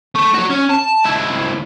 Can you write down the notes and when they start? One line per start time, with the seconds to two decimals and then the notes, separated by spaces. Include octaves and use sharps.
0.15 A3
0.35 F#4 C#5
0.51 C#4
0.70 A5
1.05 C#2 E4